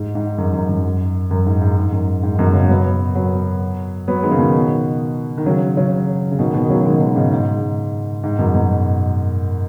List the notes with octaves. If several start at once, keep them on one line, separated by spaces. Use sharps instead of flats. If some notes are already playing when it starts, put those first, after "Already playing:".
Already playing: G#2
G#2
F#2
F#2
F#2
F#2
G#2
G#2
G#2
F#2
G#2
F#2 B2
C#3 F#3
F#3 B3
F#3 B3
F#3 B3
D#3 G#3
C#3
B2 D#3
D#3
C#3 F#3
C#3 F#3
C#3
B2 D#3
B2 D#3
C#3 F#3
D#3 G#3
B2 D#3
G#2 C#3
G#2
G#2
F#2 B2
F#2 B2